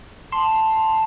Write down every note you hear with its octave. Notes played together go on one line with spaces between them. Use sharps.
A5 C6